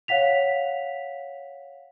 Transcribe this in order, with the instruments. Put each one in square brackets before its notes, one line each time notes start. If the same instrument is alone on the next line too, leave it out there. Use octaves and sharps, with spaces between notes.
[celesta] C#5 F5 F#5 B6 F7